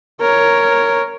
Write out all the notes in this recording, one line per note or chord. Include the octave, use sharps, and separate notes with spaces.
A#4 C#5